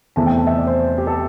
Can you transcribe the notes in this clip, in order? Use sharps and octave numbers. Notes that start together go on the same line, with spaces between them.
E2 C3 A3 C4 A5
G5
A5
E5
D5
C5
G4
A4